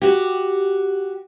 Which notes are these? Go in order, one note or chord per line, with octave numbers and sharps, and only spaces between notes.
F#4 G4